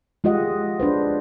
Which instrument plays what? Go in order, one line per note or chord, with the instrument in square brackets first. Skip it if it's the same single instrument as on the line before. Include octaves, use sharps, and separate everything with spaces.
[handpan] G#3 F4 G4 D#5 F#5
D4 B4 C5